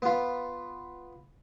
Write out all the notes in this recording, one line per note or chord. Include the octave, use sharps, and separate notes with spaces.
B3 F4